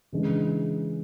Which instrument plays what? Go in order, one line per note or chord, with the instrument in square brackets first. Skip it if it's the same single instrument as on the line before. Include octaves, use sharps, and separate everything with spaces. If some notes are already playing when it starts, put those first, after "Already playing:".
[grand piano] C#3 E3 G#3 D4